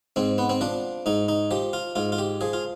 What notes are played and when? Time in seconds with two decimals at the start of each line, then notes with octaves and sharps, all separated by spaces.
0.16 G#2 C4
0.38 B3
0.49 C4
0.61 F3 D4
1.06 G#2 D#4
1.28 D#4
1.51 F3 G4
1.73 F4
1.96 G#2 F4
2.12 F4
2.18 G4
2.41 F3 G#4
2.53 F4